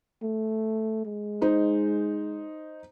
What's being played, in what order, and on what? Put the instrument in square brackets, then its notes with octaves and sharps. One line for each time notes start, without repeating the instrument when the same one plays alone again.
[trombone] A3
G#3
[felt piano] D#4 C5